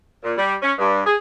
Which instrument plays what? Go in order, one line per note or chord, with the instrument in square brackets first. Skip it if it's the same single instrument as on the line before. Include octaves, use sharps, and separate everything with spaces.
[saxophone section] A#2
G3
C#4
G2
G#4